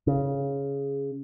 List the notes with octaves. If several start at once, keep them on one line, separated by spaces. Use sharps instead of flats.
C#3